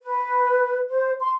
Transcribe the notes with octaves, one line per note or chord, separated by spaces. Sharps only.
B4
C5
C6